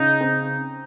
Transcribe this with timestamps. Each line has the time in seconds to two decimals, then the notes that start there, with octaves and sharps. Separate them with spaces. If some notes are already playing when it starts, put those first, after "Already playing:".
Already playing: C#3 D#4
0.21 C4